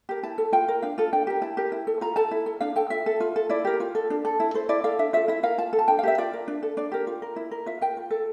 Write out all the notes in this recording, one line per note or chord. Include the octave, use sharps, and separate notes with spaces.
G4 A#4
E4 A5
A4
F4 G5
A#4
D4 F5
F4 A4
D4 G5
G4 A#4
E4 A5
G4 A#4
E4
A4
F4 A#5
A4 A5
E4
A4
D4 F5
A4 G5
F4 E5
A4
F4
A4
E4 D5
G4 A#4
F4
A4
D4
A4
E4
A4 C5
E4 D5
A4 F5
D4 E5
F4 A4 E5
E4 E5
A#4 F5
F4 A5
A4
A5
D4 G5
F5
G4 A#4 E5
F4 D5
A#4
D4
A4
D4 D5
G4 A#4
F4
A#4
E4
A#4
F4 E5
A#4 G5
F4
A4